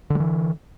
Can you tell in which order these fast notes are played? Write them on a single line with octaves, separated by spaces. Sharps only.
D3 G3 E3